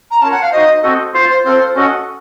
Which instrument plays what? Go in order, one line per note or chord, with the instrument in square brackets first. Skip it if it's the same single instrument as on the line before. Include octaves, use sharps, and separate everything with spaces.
[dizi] A#5
[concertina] C#4 F4 A#4 C#5 [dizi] A5
[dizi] F#5
F5
[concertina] D#4 F#4 C5 [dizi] D#5
[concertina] C4 F#4 A4 D#5
F4 C5 F5
[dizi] C5
[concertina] C4 F4 A4 [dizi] C5
[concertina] C#4 F#4 A4 D#5 F#5